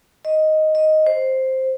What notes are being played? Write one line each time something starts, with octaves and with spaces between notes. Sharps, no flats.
D#5
D#5
C5